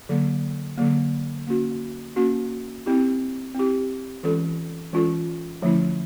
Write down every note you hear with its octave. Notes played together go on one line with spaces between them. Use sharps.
D3 F#3 A#3
D3 F#3 A#3
A#3 C#4 F#4
A#3 C#4 F#4
C4 E4 G4
C4 E4 G4
E3 G#3 C#4 F4 A4
E3 G#3 C#4 F4 A4
D3 F3 A3 C#4 E4